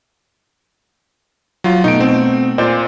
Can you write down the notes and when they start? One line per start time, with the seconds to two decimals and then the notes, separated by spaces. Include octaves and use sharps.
1.64 F#3 F4
1.84 B2 A3 D#4 D7
2.00 C4
2.58 A#2 C5 D5